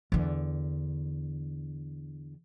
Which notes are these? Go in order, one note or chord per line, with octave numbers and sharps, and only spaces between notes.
E2 D3